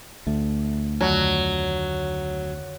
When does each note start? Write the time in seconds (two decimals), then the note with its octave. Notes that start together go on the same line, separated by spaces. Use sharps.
0.27 D2 A3
1.01 F2 D3 D#3 F#3